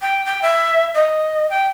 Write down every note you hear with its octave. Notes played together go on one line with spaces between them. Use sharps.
G5
G5
E5
D#5
G5